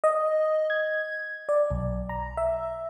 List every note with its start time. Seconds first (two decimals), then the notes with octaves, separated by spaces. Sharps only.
0.04 D#5
0.70 G#6
1.49 D5
1.71 B1
2.09 A#5
2.37 E5